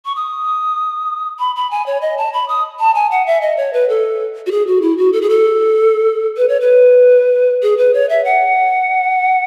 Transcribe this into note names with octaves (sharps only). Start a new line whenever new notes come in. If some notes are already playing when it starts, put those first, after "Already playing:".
C#6
D#6
B5
B5
G#5
C#5
D#5
A5
B5
D#6
A5
G#5
F#5
E5
D#5
C#5
B4
A4
F#4
G#4
F#4
E4
F#4
A4
G#4
A4
B4
C#5
B4
G#4
B4
C#5
E5
F#5